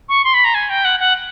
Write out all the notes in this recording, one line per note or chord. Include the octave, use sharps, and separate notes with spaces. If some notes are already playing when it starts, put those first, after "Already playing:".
C#6
C6
B5
A#5
G#5
G5
F#5
F#5